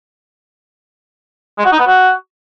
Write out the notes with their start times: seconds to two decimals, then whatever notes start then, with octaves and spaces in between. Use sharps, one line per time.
1.58 G#3
1.65 F#4
1.72 D#4
1.79 B3
1.86 F#4